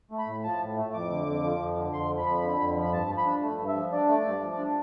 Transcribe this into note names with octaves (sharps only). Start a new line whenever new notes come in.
A3
B5
A2
F3 A5
A2
A3
F2 D6
D3
F2
F3
F2
D3
F2 C6
F3
B5
F2
D3
F2
F3
B5
G2 A5
F3
B5
D4
A3
G2
E5
F3
D4 D5
A3
G2
F3
D4